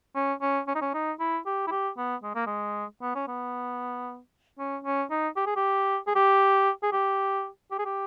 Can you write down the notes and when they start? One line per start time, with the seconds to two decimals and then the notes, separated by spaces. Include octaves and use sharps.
0.15 C#4
0.41 C#4
0.67 C#4
0.75 D#4
0.81 C#4
0.94 D#4
1.20 E4
1.46 G4
1.67 E4
1.71 G4
1.97 B3
2.23 G#3
2.35 A#3
2.46 G#3
3.02 B3
3.15 C#4
3.27 B3
4.59 C#4
4.85 C#4
5.10 D#4
5.36 G4
5.46 G#4
5.56 G4
6.07 G#4
6.15 G4
6.83 G#4
6.92 G4
7.71 G4
7.78 G#4
7.85 G4